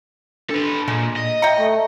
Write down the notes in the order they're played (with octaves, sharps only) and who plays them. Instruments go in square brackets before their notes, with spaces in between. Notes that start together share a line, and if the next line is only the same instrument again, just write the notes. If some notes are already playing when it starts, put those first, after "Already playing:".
[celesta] D4 [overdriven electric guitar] A4 B4
[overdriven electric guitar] A#2 [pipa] G#3
[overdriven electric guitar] D#5
[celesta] E5 C#7 [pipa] G5 A#5
[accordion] A3